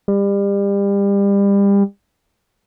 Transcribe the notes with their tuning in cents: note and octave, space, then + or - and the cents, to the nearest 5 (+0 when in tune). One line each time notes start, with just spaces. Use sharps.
G3 +30